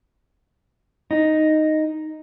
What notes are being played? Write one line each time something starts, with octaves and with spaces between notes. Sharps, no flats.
D#4